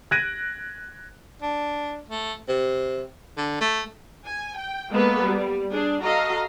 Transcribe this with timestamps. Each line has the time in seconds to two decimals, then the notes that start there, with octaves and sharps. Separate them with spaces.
0.11 F#6 G#6 A#6 D7 D#7
1.42 D4
2.08 A3
2.49 C3
3.37 D3
3.61 A3
4.26 G#5
4.58 G5
4.91 G#3 A#3 B3 A4 B4
5.22 G3
5.71 D4 G#4
6.02 F#4 A4 D#5 F5 A#5